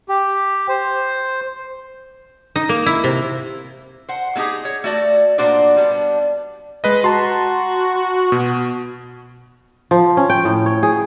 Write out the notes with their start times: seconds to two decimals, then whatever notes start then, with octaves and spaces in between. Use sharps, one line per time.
0.09 G4
0.68 C5
2.56 D#4
2.69 A#3
2.86 E4
3.04 C3
4.09 C5 F#5
4.36 F#3 A3 D#4 G4 G#4
4.65 C#5
4.84 A3 F#4 D5
5.38 A#2 D4 F#4 C5 D5
5.76 G3 B3 D4
6.84 G#3 B4 D#5
7.04 F#4 A5 A#5 C6
8.32 B2
9.91 F3
10.17 C#4
10.29 G5
10.45 A2
10.66 C#5
10.83 G#4